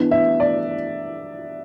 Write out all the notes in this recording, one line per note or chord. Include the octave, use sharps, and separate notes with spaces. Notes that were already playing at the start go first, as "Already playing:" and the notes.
Already playing: E3 B3 D4
E5
D5